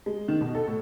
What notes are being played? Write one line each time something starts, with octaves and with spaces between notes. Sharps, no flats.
G#3
D#3
B2
A4
A2